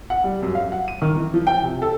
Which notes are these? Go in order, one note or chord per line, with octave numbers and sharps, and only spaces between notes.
F#5
G3
F#2
F5
F#5
D#7
D#3
E3
F3
G5
C3
A4